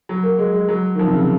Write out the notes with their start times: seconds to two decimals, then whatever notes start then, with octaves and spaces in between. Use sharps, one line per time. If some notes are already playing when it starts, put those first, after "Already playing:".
0.09 F#3
0.23 A#3
0.38 G#3
0.53 G#3
0.69 F#3
0.95 D#3
0.99 F3
1.07 C3
1.14 C#3